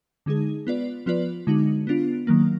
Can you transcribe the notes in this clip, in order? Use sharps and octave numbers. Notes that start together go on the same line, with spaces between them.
D3 G#3 D#4 G#4
B3 F4 B4 D5
F3 B3 F4 B4 D5
D3 G#3 D#4 F#4
B3 D4 F4
D#3 F#3 A#3